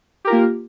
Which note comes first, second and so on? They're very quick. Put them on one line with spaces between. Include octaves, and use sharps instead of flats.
G4 A#4 F4 A#3